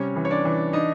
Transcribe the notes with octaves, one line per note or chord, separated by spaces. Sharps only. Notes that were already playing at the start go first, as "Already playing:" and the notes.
Already playing: C3 G3 C#4 C#5
E3
C#5
D4 D5
E3
D4 D#4 D#5